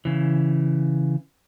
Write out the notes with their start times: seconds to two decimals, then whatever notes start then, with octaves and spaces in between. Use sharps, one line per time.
0.05 C#3 E3